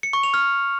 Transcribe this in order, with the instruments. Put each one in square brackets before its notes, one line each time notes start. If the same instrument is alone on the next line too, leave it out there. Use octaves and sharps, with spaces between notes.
[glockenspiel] C#7
C#6
F7
F6